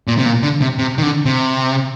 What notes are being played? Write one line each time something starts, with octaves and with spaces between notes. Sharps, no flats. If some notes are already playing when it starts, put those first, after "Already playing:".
A#2
C3
A#2
D3
C3
C3
D#3
D3
C3